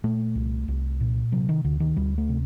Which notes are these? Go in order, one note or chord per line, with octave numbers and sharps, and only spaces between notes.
A#2 A3
C2
C2
A#2
C3 F#3
D#3
D2 D3
D#3
D2 G3
A3
C3